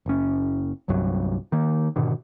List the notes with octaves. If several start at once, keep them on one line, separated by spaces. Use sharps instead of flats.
F#1 C#4
G1 C2 G2 F#3
D#3 A#3
G#2 B2 D3 D#3